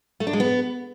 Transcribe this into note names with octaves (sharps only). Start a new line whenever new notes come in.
A3
D4
G#3
B3